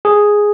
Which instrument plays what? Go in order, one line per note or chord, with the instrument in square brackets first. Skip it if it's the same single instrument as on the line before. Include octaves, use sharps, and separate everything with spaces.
[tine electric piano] G#4